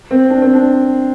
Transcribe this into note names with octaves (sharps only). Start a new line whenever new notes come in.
C4
D4
C4
D4